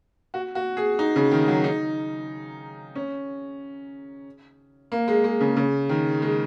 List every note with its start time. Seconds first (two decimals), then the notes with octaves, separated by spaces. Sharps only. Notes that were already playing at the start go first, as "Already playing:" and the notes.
0.34 F#4
0.55 F#4
0.77 G#4
0.99 D#4
1.16 C#3
1.31 D#3
1.48 F#3
1.64 D#4
2.95 C#4
4.92 A#3
5.08 G#3
5.24 G#3
5.41 C#3
5.56 C#3
5.89 D#3
6.22 G#3